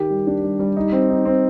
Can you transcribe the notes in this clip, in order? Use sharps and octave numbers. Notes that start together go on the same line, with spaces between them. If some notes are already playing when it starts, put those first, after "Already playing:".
Already playing: D#3 G4
G3
D4
G3
G3
D#4
C4
D#4
C4